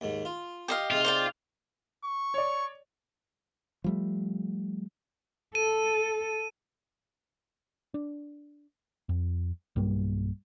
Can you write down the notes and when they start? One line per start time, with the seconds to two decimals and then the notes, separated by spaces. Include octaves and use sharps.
0.01 D#2 G#2
0.25 F4
0.68 G4 D#5 F5
0.91 C3 G#3 D#4 F4
1.04 C5 D5 G5
2.04 C#6
2.34 C#5 D5
3.84 F3 G3 A3
5.55 A4 D#7
7.94 D4
9.09 F2
9.76 B1 G2 G3 A#3